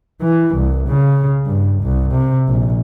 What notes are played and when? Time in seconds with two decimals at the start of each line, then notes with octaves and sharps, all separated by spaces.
0.22 E3
0.55 C2
0.88 C#3
1.46 G2
1.83 C2
2.12 C3
2.48 A#1